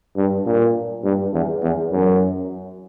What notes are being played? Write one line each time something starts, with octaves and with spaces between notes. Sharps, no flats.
G2
A#2
G2
E2
E2
F#2